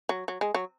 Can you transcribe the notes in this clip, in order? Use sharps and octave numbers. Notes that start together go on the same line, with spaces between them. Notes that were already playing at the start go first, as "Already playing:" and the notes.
F#3
F#3
G#3
F#3